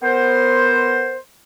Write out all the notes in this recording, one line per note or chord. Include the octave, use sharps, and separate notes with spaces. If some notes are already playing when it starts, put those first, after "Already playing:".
B3 A#4 C5